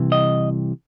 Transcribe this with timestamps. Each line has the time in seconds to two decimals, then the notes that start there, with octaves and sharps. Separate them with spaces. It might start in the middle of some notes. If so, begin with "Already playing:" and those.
Already playing: C2 C3 E3
0.12 D#5